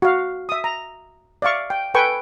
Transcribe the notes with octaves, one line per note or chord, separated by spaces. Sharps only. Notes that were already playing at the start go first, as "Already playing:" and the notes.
F#4 F5
E5 D#6
A#5
D5 E5 F5 C#6
G5
A4 B4 G5 G#5 C#6